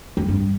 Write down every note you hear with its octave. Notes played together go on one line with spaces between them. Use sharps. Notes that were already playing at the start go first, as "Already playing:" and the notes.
F2
G2